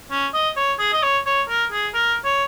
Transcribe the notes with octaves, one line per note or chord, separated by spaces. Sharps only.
C#4
D#5
C#5
G#4
D#5
C#5
C#5
A#4
G#4
A#4
C#5